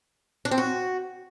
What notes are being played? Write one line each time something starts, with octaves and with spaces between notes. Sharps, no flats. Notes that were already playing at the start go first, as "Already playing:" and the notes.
D4
C4
F#4